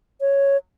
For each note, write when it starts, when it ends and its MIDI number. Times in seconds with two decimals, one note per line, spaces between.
0.21 0.57 73